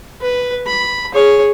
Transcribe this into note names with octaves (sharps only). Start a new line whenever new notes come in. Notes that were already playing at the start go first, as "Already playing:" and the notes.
B4
B5
G#4 C#5